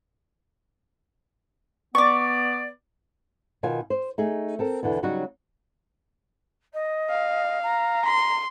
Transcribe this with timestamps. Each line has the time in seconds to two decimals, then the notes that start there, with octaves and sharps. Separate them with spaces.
1.95 B3 D5 C#6 D6
3.63 B2 D#3 F4 G#5
3.90 C5
4.18 A3 D#4 G#4
4.59 C4 A4 A#4
4.83 E2 B2 D3 E3
5.03 C#3 F#3 G3 D#4 F#4
6.73 D#5
7.10 F5
7.63 A#5
8.05 C6